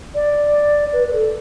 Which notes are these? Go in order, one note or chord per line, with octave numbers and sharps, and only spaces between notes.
D5
B4
B4
A4